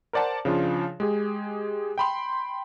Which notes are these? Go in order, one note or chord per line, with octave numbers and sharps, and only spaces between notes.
A#4 C5 D5 F#5 A5
C#3 F3 D4 F4
G#3 G4 G#4
G5 B5 C6